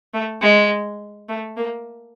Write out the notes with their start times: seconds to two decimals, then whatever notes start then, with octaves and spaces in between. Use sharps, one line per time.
0.14 A3
0.42 G#3
1.29 A3
1.57 A#3